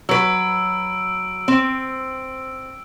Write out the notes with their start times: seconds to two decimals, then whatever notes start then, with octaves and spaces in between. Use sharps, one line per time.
0.09 F#3 B4 E6 D7
1.48 C4